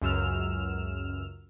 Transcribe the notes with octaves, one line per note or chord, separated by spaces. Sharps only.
C#2 F#2 E6 F6